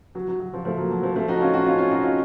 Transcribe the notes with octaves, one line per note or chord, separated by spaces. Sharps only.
F#3
F#3
F#3
F3
F3 A3
F#3 A#3
F#3
F3
F3 A3
D#4 F#4
C#4 F4
D#4 F#4
C#4 F4
C#4 F4
D#4 F#4
C#4 F4